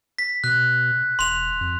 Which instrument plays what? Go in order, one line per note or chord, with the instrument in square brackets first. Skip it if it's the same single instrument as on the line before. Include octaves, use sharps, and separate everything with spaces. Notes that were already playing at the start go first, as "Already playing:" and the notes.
[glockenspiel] B6
[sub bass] B2 [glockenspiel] F#6
[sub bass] E1 [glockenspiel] C6 F7
[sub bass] F2